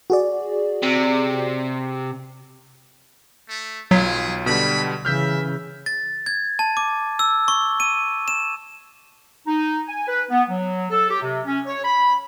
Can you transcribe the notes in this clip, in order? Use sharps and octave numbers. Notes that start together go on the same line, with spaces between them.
F#4 G#4 D5
C3
A3
B1 F#3 F4 G#4 B6
B2 D3 G3 B5
C#3 E3 E5 F6 G6 B6
A6
G#6
A5
D6
E6
C#6
D#7
E7
D#4
G#5
B4
B3
F#3
A4
G4
C3
C#4
C#5
B5